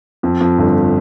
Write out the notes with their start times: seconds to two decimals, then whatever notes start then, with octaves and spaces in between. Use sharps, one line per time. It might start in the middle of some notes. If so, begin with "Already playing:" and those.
0.23 F2
0.40 F2
0.58 G1